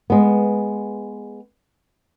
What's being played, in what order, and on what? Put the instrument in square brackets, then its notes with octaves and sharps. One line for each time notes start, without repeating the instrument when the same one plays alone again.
[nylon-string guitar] G#3 B3